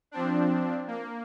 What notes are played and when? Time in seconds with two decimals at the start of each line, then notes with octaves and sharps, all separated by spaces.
0.11 F3 C4 D4
0.87 A#3